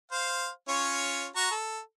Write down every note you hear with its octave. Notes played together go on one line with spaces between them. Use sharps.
C5 F5
C#4 F4 C#5
F#4 A#5 C#6
A4